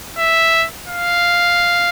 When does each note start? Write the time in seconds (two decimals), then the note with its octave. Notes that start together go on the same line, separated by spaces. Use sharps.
0.18 E5
0.88 F5